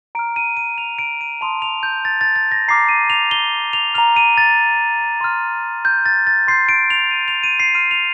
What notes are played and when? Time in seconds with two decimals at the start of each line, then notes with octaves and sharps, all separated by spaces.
0.15 A#5 F6 D7
0.36 D#7
0.57 D#7
0.78 F7
0.99 D7
1.21 D#7
1.41 A5 C6 D#6 F7
1.62 F7
1.83 G6
2.05 A6
2.21 A6
2.36 A6
2.52 A#6
2.68 A#5 D6 F6 C7
2.89 D#7
3.10 F7
3.31 G7
3.73 F7
3.94 A#5 F6 F7
4.16 D#7
4.38 A6
5.21 C6 F6
5.85 G6
6.06 A6
6.27 A6
6.48 C6 G6 C7
6.69 D7
6.90 F7
7.11 D#7
7.28 F7
7.43 D#7
7.60 C7
7.74 C6 F6 D#7
7.91 F7